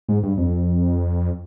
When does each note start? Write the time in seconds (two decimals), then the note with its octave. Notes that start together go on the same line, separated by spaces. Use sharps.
0.09 G#2
0.23 G2
0.38 F2